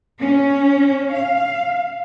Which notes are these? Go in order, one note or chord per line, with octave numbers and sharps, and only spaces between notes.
C#4
F5